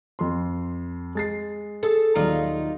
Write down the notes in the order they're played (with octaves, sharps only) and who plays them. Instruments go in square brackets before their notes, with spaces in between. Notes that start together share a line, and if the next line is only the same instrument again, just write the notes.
[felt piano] F2 C6
G#3 A6 C7
[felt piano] G#4 [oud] A4
[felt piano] D#1 F#3 [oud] D#4 F4 D5